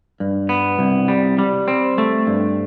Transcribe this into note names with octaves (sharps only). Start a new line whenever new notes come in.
G2
B3
C2
G3
G3
C4
A3
G2